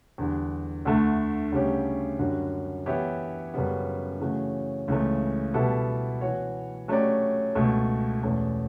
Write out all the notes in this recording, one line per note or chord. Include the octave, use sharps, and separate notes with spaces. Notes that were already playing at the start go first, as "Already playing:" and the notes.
E2 D3 G3
D2 D3 A3
D2 C#3 G3 C#4 G4
F#2 D3 G3 C#4 F#4
E3 B3 E4 G4 C#5
F#2 C#3 G3 B3
C#3 E3 A3 C#4 F#4
C#2 C#3 E3 A3
B2 G3 B3 E4 A4
E3 B3 F#4 C#5
F#3 A3 C#4 G4 D5
C#2 B2 A3
E2 B2 A3 C#4